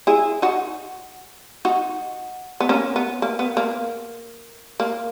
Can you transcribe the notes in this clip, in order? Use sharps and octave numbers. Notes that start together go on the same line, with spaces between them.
E4 G#4
D#4 F#4
D#4 F#4
B3
A#3 C#4
B3
A#3
B3
A#3
A#3